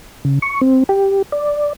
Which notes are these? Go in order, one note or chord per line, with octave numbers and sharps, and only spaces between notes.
C#3
C#6
C4
G4
D5